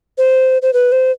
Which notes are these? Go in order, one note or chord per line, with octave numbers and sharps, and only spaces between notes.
C5
C5
B4
C5